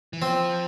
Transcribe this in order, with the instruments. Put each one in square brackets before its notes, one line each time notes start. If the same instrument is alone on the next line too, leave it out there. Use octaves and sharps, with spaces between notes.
[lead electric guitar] E3
[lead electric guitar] F3 [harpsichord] C4